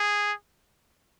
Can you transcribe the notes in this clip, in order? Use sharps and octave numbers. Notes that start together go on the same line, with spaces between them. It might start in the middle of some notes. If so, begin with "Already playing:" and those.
Already playing: G#4